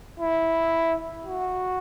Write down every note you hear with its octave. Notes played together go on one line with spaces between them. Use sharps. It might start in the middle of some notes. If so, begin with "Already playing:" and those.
E4
F#4